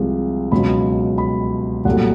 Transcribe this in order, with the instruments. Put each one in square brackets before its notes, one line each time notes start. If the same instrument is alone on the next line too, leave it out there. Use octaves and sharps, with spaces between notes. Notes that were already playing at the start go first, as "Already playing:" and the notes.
Already playing: [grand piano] C2 C3 F3 G#3
C#2 B2 F#3 B5
B5
C2 A#2 F#3 A3 F#5